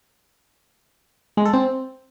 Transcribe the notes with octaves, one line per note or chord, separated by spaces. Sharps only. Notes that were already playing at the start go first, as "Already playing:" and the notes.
G#3
A4
C4